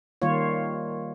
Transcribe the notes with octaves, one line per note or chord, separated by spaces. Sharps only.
D#3 G3 A#3 F4 C#5